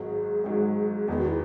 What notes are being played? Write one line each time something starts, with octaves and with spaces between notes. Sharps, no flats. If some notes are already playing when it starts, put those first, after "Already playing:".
Already playing: G#1 G#2 F#3 G#4
G#1 G#2 F#3
E2 D#3 G#3 B3 G#4
F#4
E4